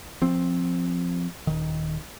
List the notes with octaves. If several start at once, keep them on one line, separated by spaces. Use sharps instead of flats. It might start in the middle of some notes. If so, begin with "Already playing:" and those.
F3 C4
D#1 D#3